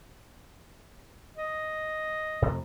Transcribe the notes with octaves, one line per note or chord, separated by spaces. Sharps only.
D#5
F2 C3 A3